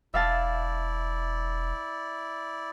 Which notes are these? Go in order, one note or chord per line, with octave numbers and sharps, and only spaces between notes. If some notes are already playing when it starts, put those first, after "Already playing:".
E1 E4 D5 E5 F5 A5